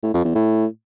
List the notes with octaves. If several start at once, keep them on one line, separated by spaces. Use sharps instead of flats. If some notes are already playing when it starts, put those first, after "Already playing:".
A2
F2
E2
A2